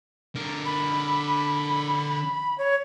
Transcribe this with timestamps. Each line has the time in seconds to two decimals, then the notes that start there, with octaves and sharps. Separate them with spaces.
0.35 D3 A#4
0.66 B5
2.58 C#5